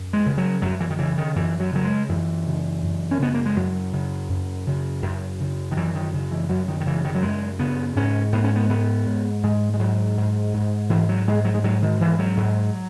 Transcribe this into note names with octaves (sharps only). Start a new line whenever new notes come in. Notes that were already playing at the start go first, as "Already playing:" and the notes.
Already playing: F#2
G#3
C#3
F#3
F#2 F#3
E3
D#3
C#3 E3
D#3
F#2 E3
F#3
C#3 F#3
G#3
F#2 E3
C#3
F#2
C#4
C#3 B3
A#3
G#3
F#2 F#3
C#3
F#2
C#3
F#2
C#3
D#3
F#2 E3
D#3
C#3
E3
F#2 F#3
D#3
D#3
C#3 E3
D#3
F#3
F#2 G#3
C#3 B3
G#2 C#4
G#2 B3
C#4
B3
G#2 B3
G#2
G#2 G#3
G#3
G#2 F#3
G#2
G#2
G#2 E3
F#3
G#2 G#3
F#3
G#3
G#2 F#3
D#3
G#2 E3
F#3
G#2